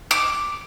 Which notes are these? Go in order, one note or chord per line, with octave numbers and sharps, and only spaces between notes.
D6